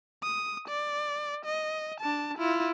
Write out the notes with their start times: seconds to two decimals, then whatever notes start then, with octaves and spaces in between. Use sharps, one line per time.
0.23 D#6
0.68 D5
1.45 D#5
2.00 D4 A5
2.37 E4 F4